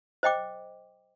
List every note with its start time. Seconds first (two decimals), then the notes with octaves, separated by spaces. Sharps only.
0.23 C5 D#5 G5 D6